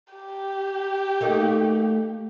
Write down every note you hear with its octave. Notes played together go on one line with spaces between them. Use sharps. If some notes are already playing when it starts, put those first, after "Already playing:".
G4
A3 A#3 D#4